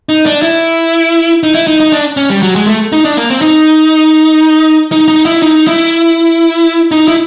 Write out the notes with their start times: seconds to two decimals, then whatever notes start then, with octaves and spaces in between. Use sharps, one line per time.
0.09 D#4
0.26 D4
0.42 E4
1.43 D#4
1.55 E4
1.67 D#4
1.80 D#4
1.93 D4
2.17 C#4
2.30 G3
2.42 F#3
2.56 G#3
2.67 A3
2.92 D#4
3.05 D4
3.17 A#3
3.30 C4
3.42 D#4
4.92 D#4
5.08 D#4
5.26 E4
5.42 D#4
5.67 E4
6.92 D#4
7.08 E4